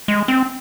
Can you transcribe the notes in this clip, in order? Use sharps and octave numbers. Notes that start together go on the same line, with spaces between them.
G#3
C4